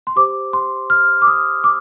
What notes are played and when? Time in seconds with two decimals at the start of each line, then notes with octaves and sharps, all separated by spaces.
0.07 C6
0.16 G4 C5 D6
0.53 C6
0.90 F6
1.22 D6
1.27 D#6
1.64 D6